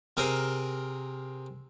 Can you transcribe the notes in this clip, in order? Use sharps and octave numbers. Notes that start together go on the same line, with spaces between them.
C3 C4 G#4 A#4 C5